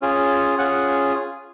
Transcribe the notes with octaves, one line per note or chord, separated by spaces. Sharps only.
C#4 F4 G#4
C#4 F4 G#4 F#5